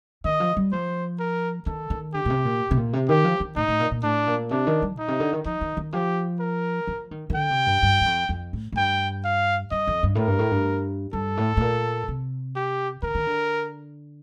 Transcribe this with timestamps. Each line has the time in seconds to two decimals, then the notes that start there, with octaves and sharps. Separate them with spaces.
0.24 D#3 D#5
0.40 F3
0.57 G3
0.72 F3 C5
1.19 A#4
1.66 D#3 A4
1.90 D#3
2.14 D3 G4
2.25 A#2
2.30 C3
2.45 A#2
2.71 C3
2.77 A#2
2.93 C3
3.09 D#3 G4
3.24 F3
3.40 D#3
3.56 A2 D#4
3.68 A2
3.80 A#2
3.91 A#2
4.03 A2 D4
4.27 A#2
4.51 C3 D4
4.67 D#3
4.82 G3
4.95 A#2 D#4
5.08 C3
5.20 D3
5.33 D#3
5.46 F3 D#4
5.61 D#3
5.77 D#3
5.93 F3 G4
6.40 A#4
6.87 F3
7.11 D#3
7.30 D#3
7.35 D3 G5
7.51 C3
7.67 G2
7.82 G2
8.01 G2
8.06 F2
8.29 F2
8.53 A2
8.72 A2
8.77 G2 G5
9.24 F5
9.71 G2 D#5
9.87 F2
10.03 G2
10.15 A2 A#4
10.27 G2
10.39 A2
10.51 G2
11.13 G2 A4
11.37 A2
11.57 A2
11.61 A#2
12.08 C3
12.56 G4
13.03 D3 A#4
13.15 D#3
13.27 D3